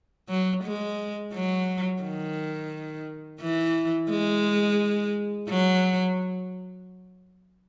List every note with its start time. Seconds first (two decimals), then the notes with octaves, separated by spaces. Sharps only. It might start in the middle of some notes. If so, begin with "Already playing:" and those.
0.29 F#3
0.64 G#3
1.33 F#3
2.03 D#3
3.41 E3
4.10 G#3
5.49 F#3